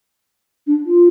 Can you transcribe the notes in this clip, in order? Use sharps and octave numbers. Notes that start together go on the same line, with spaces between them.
D4
F4